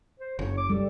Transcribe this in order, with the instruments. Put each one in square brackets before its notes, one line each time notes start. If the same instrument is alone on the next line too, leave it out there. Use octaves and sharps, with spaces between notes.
[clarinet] C5
[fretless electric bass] F#1 [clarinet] C#5
[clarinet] D6
[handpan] G3 [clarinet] A4